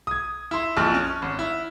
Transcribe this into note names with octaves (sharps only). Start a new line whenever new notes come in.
D#6 G#6
E4 C6
A#1 F2 F3 A5 F6 F#6
C#4
G#1
E4